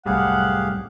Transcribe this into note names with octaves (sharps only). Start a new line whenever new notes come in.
C2 F#2 A2 G3 G4 G#4 F5 F#5